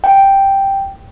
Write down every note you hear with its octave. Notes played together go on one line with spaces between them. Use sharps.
G5